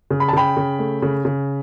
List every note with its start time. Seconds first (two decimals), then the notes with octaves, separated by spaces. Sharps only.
0.11 C#3
0.20 B5
0.28 A5
0.33 C#3 G5 B5
0.57 C#3
0.79 A3
1.02 C#3
1.25 C#3